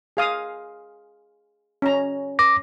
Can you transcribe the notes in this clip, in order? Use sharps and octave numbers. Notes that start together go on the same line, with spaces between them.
G#4 F5 D#6
C#4 A#5
D6 A#6